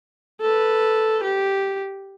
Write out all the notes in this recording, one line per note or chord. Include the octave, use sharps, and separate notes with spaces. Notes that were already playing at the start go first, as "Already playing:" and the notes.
A4 B4
G4